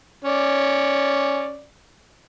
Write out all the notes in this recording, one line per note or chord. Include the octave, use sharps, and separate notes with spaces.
C#4 D5